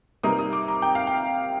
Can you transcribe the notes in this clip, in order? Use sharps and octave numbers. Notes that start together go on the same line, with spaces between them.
C3 G3 A#3 D#4 D#6
D#6
D6
A#5
G5
F5
G5